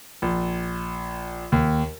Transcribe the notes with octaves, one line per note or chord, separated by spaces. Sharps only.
A#1
D#2